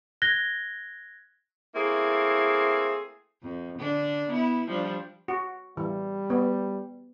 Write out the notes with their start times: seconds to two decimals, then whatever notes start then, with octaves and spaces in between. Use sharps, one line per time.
0.22 F#6 G#6 A#6 G7
1.75 A3 A#3 C4 E4 G#4
3.43 F2
3.78 D3 D4
4.30 B3 E4
4.68 F3 G3 D4
5.28 F#4
5.77 E3 G3
6.30 B3